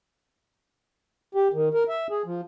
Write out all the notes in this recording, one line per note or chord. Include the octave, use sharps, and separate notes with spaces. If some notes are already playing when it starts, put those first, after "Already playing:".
G4
D#3
A#4
E5
G#4
F3